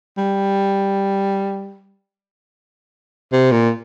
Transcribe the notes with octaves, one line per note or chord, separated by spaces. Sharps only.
G3
C3
A#2